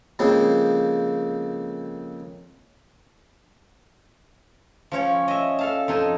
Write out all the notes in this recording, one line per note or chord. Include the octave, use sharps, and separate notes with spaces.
F2 C#3 F3 G#3 A#3 C4
F3 C#4 C#5
D#5 E5
A4 F5 A5
F2 D#4 A4 G#5